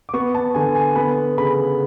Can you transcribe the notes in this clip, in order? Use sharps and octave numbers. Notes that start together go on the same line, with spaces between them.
D6
B3 C#6
A5
D3 G#5
G#5
B3 B5
C#3 B5